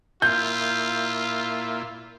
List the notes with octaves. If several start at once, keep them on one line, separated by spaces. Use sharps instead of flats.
A#2 E4 F4 G6